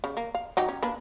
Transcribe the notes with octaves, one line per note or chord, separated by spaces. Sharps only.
C#3
A#3
F5
F#3 D#4 G4
C#4
A#3 D4 B4